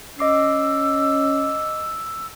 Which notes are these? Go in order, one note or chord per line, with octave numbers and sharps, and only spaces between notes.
C#4 D#5 D6 E6 C7